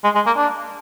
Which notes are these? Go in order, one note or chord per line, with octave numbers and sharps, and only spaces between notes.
G#3
G#3
A#3
D4